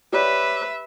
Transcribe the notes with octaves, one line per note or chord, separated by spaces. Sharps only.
G4 B4 C#5 D5 E5